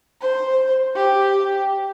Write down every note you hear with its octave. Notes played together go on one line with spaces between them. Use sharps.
C5
G4